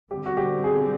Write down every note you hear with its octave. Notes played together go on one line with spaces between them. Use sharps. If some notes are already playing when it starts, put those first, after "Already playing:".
D3 G3 C4 G4
F#4
G4
G#4